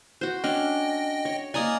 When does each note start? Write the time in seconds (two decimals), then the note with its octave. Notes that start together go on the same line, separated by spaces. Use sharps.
0.21 F#4 C5
0.44 C#4 D4 D#5 G5
1.25 C#5
1.54 A#3 D5 D#5 G#5 A#5 D#6